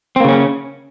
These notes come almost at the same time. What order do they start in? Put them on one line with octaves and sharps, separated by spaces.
C4 A#3 C#3 C#4